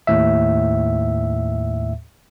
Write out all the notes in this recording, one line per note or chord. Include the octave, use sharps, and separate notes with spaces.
D#2 A2 E5